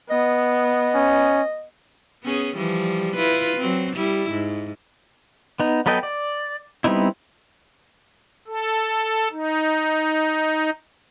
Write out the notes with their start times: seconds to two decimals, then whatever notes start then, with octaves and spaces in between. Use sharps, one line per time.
0.10 B3 D#5
0.95 C#4
2.24 B3 C#4 G#4
2.57 E3 F3 G3
3.16 E4 F4 B4
3.57 F#3 C4
3.96 G3 E4
4.31 G#2
5.60 B3 D#4
5.86 F#3 B3 A4 D#5 G5
6.03 D5
6.84 G3 B3 C4 D#4 E4
8.47 A4
9.32 D#4